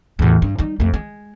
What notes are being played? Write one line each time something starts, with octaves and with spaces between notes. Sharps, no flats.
E2 A2
G2
G3 D#4
F2 A3
G#3